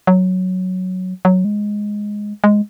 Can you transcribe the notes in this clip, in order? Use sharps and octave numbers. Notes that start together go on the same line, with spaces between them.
F#3
F#3
G#3
G#3